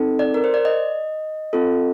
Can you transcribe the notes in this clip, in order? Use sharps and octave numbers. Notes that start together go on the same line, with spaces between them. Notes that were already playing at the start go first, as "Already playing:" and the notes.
Already playing: C4 D#4 A4
D5
A#4
C5
D5
D#5
C4 F4 A4